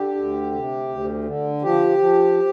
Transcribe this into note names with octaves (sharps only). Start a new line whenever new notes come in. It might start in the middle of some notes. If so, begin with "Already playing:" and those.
Already playing: D3 G4
D2
C3
D2
D3
F3 G4
F3